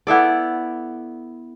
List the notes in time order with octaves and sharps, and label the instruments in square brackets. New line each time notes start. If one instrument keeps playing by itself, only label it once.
[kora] B3 E4 A4 D5